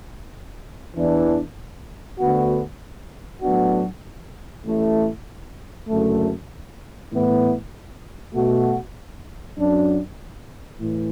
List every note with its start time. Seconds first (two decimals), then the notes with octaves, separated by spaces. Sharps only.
0.95 E2 E3 D4
2.18 D2 D3 B3 F#4
3.41 A2 F#3 B3 D4 F#4
4.64 A1 A2 A3 E4
5.87 F#1 F#2 D3 A3
7.10 A2 E3 B3
8.33 B2 A3 F#4
9.56 F#2 F#3 D4
10.79 A2 E3